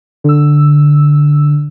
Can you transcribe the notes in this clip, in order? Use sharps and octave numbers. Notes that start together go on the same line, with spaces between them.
D3 E6